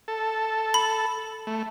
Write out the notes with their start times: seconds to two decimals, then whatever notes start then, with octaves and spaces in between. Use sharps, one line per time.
0.08 A4
0.74 B5
1.47 A3